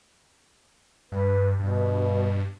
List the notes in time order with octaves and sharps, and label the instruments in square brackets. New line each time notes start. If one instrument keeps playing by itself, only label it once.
[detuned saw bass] G2 [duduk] B4
[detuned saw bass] G2 [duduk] B2